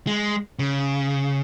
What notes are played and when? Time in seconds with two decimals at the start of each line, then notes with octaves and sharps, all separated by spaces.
0.07 G#3
0.59 C#3